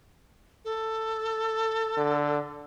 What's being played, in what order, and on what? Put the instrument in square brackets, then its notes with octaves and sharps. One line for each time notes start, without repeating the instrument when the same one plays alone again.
[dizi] A4
[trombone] D3